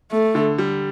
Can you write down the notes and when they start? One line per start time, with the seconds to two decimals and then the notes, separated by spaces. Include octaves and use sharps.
0.12 A3
0.35 D3
0.58 G3